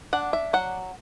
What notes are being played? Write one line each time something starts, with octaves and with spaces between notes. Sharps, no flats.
D4 F#5
E5
F#3 F#5